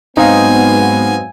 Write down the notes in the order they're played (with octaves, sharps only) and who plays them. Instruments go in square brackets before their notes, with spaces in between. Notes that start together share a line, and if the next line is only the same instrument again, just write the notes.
[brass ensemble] G#2 F#3 B3 [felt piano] C4 D#5 F5 [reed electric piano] D#4 [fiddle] G#5